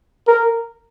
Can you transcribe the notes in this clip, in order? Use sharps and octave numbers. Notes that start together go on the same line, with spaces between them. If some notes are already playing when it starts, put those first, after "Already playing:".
A#4